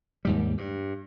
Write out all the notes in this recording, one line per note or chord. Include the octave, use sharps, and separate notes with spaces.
D#2 G#2 G3
G2